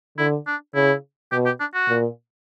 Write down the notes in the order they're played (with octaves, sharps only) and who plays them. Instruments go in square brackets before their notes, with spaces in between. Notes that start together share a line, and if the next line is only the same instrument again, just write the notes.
[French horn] D3 [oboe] E4
[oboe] D4
[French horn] C#3 [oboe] E4
[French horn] B2 [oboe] G4
[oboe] G4
D4
F#4
[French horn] A#2